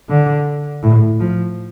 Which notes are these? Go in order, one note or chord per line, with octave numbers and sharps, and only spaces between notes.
D3
A2
F3